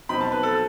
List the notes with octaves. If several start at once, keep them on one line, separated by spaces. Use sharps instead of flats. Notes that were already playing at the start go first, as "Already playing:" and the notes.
B2 F#3 C4 D#4 B5
A5
B4
A4